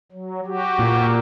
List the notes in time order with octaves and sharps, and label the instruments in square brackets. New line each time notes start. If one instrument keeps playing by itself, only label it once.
[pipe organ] F#3
F#4 G4
[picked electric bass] A#2